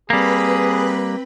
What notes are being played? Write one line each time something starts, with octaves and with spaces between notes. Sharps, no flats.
G3 A#3 C4 G#4 B4 B5